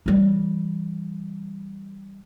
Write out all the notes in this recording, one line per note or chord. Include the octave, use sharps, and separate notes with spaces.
E3 G3